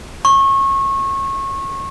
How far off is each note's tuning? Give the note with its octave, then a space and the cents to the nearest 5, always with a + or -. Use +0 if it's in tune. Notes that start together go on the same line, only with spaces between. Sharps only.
C#6 -25